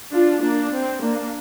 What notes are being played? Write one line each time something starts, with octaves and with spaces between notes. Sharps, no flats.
D4 F4
A#3 D4
C4
A#3 D4